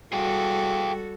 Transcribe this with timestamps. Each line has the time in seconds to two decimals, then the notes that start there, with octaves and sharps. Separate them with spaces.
0.13 G3 F#4 G#4 A4 F5 G5